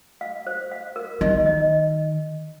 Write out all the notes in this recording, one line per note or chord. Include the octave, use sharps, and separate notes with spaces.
F5
C5
F5
A#4
D#3 D#5
D#5